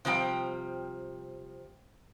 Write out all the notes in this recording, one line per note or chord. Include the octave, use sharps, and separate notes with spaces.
C3 F3 G3 G5